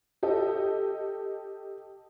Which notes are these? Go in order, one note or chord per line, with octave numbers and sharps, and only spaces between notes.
G4 A4 D#5